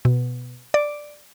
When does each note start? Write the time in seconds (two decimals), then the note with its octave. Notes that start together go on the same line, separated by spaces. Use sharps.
0.05 B2
0.74 D5